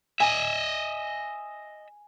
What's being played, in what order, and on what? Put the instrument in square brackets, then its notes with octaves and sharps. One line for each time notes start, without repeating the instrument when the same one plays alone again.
[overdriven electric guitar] D#5 E5 [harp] G#5